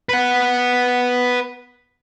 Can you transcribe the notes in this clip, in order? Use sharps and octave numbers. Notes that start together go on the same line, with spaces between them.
B4 F#5